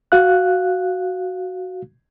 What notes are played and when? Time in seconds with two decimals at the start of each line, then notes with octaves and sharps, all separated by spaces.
0.12 F#4 F5 F#6